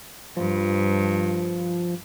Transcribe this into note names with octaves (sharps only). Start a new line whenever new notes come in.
G2 F3